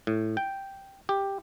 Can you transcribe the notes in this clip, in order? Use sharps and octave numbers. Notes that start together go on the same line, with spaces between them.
A2
G5
G4